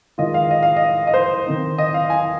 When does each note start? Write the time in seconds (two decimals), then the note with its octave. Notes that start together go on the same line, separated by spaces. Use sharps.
0.18 D#3 G#3 F4 D#5
0.34 F5
0.51 D#5
0.63 F5
0.76 D#5
1.07 D#5
1.14 C5
1.46 D#3 C4 D#4
1.78 D#5
1.94 F5
2.10 G#5